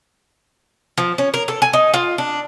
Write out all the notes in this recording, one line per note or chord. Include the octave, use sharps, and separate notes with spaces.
F3
C#4
A#4
A4
G#5
D#4
F4
D4